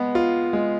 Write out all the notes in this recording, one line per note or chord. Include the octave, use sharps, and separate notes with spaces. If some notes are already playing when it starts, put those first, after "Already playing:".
Already playing: G#3 B3
F4
G#3